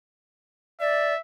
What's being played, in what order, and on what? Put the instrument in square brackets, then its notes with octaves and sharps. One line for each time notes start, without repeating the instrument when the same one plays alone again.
[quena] D5 [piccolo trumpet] E5